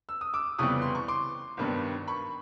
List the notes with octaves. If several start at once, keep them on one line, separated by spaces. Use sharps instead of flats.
E6
D#6
D6 E6
F2 C#3 E3 G3 B3 C#6 D#6
C6
C#6
C6 D6
G#1 G2 D#3 G3 B3
B5 C#6